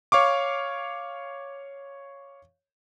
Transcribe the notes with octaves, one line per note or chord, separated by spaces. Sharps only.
C#5 F5 C#6 D6